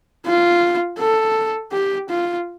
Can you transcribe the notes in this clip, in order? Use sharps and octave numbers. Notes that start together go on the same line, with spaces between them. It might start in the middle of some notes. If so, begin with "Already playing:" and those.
F4
A4
G4
F4